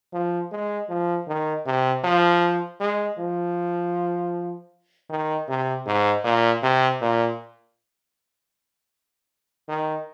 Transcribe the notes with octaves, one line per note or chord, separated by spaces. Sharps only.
F3
G#3
F3
D#3
C3
F3
G#3
F3
D#3
C3
G#2
A#2
C3
A#2
D#3